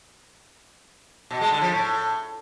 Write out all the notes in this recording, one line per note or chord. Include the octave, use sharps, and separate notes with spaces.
B2
G#3
D3
F3
A2